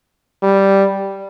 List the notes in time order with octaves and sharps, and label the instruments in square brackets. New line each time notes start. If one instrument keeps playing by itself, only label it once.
[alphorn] G3